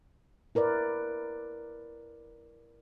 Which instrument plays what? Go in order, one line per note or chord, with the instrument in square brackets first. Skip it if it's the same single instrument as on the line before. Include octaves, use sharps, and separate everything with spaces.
[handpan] E4 A#4 B4 D5